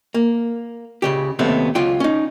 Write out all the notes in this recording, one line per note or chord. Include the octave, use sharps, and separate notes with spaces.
A#3
C#2 C#3 G4
D#2 C3 F#3 A3 B3
C#2 F#3 F4 G5
C#4 D#4